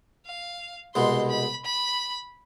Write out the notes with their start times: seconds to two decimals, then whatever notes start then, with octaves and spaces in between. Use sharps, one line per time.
0.26 F5
0.95 C2 B2 G#3 C6
1.30 B5
1.65 B5